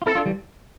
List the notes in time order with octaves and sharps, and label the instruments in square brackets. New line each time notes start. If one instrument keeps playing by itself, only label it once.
[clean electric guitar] F4
[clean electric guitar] C4 E4 [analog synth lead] A4
[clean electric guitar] D4 F4
E3 G3